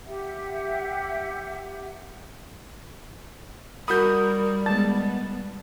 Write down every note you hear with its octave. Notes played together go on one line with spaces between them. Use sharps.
G4 E5 F#5
G3 F#4 A#4 B5 D#6 G6
G#3 B3 A5 A6